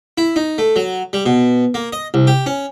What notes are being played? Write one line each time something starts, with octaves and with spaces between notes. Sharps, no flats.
E4
D#4
A3
F#3
G3
B2
A#3
D#5
C2
G4
C#4